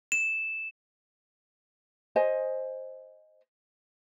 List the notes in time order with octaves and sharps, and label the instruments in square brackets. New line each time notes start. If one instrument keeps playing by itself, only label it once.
[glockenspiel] E7
[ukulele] C5 D#5 G#5